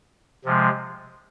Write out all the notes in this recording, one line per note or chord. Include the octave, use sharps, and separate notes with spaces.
C3 F3 G#3